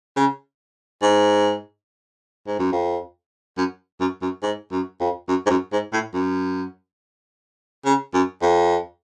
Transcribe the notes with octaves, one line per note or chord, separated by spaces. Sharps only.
C#3
G#2
G#2
F#2
F2
F#2
F#2
F#2
G#2
F#2
F2
F#2
G#2
F#2
G#2
A2
F#2
C#3
F#2
F2